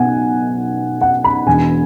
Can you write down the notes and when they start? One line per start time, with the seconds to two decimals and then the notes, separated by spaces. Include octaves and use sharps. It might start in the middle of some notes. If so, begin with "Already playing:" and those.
Already playing: B1 B2 B3 F#5 G#5
1.01 F#5
1.24 B5
1.46 E1 E2 B2 G#5